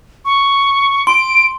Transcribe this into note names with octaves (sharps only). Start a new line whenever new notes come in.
C#6
C6 D7